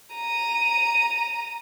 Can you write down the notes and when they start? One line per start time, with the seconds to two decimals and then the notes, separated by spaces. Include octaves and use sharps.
0.15 A#5 D#7